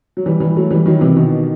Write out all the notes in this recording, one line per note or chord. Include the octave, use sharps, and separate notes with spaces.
F#3
E3 G3
E3 G3
F#3 A3
E3 G3
D#3 F#3
C3 E3
B2 D#3